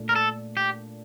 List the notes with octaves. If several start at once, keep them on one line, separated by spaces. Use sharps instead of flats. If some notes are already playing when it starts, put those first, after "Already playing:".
Already playing: A#2 A3 D4
A#4
A4
G4